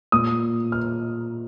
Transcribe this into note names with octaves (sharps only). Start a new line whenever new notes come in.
A#2 D#6
F6